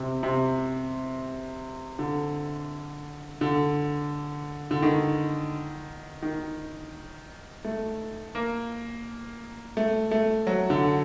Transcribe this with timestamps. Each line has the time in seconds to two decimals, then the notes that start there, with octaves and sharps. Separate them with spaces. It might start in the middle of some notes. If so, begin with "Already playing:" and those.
Already playing: C3
0.23 C3
1.99 D3
3.41 D3
4.71 D3
4.82 D#3
6.23 D#3
7.65 A3
8.35 A#3
9.77 A3
10.11 A3
10.47 F#3
10.70 D3